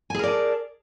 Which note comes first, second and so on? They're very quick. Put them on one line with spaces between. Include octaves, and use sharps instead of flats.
G#5 G#4 A#4 D5 A5